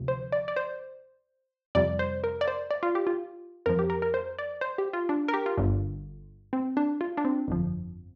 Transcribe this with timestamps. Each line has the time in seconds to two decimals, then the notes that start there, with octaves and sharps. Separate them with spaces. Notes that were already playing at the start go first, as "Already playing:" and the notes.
Already playing: D2 C3 F3
0.08 C5
0.32 D5
0.48 D5
0.56 C5
1.75 F2 C3 G3 D5
1.99 C5
2.24 A#4
2.41 D5
2.48 C5
2.71 D5
2.83 F4
2.95 G4
3.07 F4
3.66 F2 F3 A#4
3.79 G4
3.90 A#4
4.02 A#4
4.14 C5
4.39 D5
4.61 C5
4.78 G4
4.93 F4
5.09 D4
5.28 A#4
5.34 G4
5.46 F4
5.57 G1 G2 D3
6.53 C4
6.77 D4
7.01 F4
7.17 D4
7.25 C4
7.48 G1 F2 F3